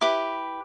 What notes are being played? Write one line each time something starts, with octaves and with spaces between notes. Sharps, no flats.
E4 G4 B4 D6